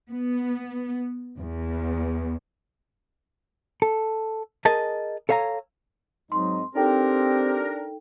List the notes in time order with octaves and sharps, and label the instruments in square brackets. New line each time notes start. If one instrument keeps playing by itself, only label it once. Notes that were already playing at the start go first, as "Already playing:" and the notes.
[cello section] B3
E2
[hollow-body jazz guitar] A4
G#4 A#4 D#5 G#5 A5
A4 C#5 F5 G#5 A#5
[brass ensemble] G#2 C4 D#4 [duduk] F#3 [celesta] C6
[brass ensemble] C4 [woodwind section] D4 A#4 [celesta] D#4 A4 G5 [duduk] G4